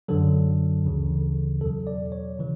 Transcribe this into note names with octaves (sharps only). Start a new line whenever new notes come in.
F#2 D3 F#3 A4
D2 C#3 E3
E2 B2 F#3 A4
D5
C#5
C#3 E3